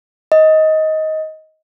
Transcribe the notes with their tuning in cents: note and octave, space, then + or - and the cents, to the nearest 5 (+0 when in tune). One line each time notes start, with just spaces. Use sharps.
D#5 +15